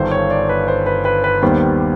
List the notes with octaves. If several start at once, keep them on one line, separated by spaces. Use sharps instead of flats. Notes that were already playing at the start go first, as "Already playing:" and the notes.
Already playing: G1 G2 D#3 C5
C#5
D5
B4
C5
B4
B4
B4
D#2 D#3 G3 B3 C5